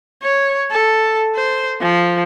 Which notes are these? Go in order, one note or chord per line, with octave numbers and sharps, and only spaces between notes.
C#5
A4
C5
F3